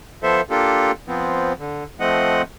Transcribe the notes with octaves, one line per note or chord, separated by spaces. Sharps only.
F3 B3 A4 C5 E5
A#3 D4 F4 G4 A4
F3 B3 C4
D3
F3 A3 C4 D#5 F#5